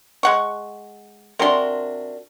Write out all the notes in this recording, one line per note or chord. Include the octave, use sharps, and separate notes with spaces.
G#3 F#5 C#6
C3 D4 F#4 A#4 C6